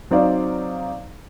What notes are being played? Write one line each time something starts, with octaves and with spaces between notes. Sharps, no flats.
F#3 C4 D#4 D5 F5